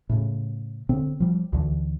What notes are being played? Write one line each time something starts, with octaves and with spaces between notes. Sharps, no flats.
A2 C#3
D3 C4
F3 G3
D2 D3 E3